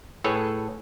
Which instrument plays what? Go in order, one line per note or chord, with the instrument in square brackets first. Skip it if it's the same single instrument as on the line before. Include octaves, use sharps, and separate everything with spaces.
[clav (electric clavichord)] A2 G#4 A4 B4 C#5